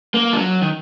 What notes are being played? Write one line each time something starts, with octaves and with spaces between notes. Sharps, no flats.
A#3
F3
F#3
D#3